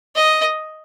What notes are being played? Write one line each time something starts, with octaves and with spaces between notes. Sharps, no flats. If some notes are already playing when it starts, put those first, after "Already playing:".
D#5